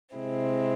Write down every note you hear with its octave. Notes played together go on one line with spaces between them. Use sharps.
C3 G#3 C4 E4